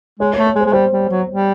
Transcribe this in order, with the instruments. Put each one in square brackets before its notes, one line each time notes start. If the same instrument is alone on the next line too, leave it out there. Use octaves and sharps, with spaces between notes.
[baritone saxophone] G#3 [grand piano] C#5
[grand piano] C#5
[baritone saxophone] A3
[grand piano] C#5
[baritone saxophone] G#3
[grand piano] C5
[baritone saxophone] G#3
[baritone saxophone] G3 [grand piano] C5
[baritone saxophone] G3
F#3
G3